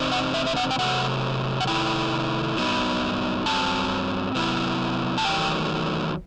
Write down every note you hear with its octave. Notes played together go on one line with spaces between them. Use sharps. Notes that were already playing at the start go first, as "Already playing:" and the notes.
Already playing: E2 C3 C4 D#4
F#5
E5
E5
F#5
G5
C3 F#3 A3 F#5
F#5
C3 D#3 A3 E4 G5
G2 F#3 B3 D#4
G2 F#3 C4 A5
C3 F#3 B3 E4
A5
E2 D#3 F#3 A3 G5